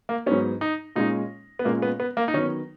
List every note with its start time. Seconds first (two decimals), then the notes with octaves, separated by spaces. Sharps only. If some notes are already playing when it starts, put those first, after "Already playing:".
0.09 A#3
0.26 G#2 F#3 B3 C#4
0.61 D#4
0.96 A#2 G#3 C#4 D#4
1.59 B3
1.65 A#2 G#3 A#3 C#4
1.82 B3
2.00 B3
2.17 A#3
2.28 D#4
2.34 D#3 F#3 B3 C#4